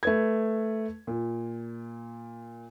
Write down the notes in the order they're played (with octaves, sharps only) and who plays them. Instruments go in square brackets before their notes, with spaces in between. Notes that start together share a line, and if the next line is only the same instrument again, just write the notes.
[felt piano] A3 B4 G#6
A#2